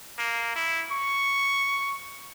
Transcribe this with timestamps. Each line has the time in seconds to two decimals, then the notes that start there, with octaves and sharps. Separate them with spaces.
0.18 A#3
0.56 E4
0.92 C#6